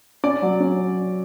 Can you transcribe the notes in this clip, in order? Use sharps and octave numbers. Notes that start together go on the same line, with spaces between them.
C#4 D5
F#3
C#4